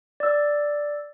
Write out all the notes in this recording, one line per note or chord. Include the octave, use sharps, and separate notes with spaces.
D5 E6